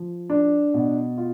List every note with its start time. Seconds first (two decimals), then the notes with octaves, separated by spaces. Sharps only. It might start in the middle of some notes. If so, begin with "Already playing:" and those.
Already playing: F3
0.30 D4
0.74 B2
1.18 F4